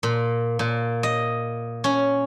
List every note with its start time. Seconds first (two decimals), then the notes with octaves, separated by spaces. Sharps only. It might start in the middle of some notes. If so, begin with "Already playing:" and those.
0.03 A#2
0.59 A#2
1.03 D#5
1.84 C#4